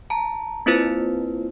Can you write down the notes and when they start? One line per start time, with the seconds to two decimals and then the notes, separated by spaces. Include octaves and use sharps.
0.10 A5 A#5
0.66 A#3 C4 E4 F4 B4 C5